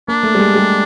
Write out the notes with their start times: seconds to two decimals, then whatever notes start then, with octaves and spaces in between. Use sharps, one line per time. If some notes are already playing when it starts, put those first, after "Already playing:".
0.08 A#3 D4
0.23 A3
0.35 G3
0.40 G#3
0.56 G3